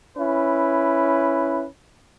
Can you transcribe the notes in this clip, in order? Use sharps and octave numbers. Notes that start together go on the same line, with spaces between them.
C#4 E4 B4